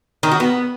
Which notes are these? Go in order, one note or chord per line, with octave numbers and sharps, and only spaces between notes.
D#3
F#4
B3